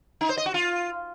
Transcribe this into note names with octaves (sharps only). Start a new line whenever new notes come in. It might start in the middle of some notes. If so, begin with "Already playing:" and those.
D#4
C5
D#5
F#4
F4